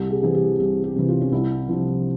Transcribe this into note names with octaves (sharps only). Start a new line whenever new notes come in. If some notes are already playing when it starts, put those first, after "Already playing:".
Already playing: C2 G4
G#4
C3 E3 G#4
G4
C2 G4
G4
C3 E3
F4
C#4
C2 E4
C3 F3